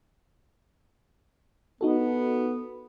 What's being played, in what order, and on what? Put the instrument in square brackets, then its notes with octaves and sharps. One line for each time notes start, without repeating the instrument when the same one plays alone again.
[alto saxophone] B3 [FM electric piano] D#4 F#4 A4